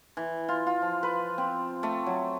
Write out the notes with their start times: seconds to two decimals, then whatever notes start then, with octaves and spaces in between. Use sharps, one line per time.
0.17 E3
0.49 F4
0.67 F4
0.82 F3
1.03 B4
1.38 C4
1.83 A3
2.06 F#3